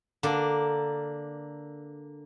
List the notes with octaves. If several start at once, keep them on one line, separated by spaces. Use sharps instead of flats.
D3 A#3 D4